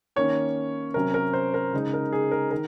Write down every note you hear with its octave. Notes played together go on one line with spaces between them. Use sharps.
D#3 A#3 C#4 C#5
C3 F#3 C#4 A#4
A#4
C5
A#4
C#3 G#3 D#4
A#4
G#4
A#4
D#3 A#4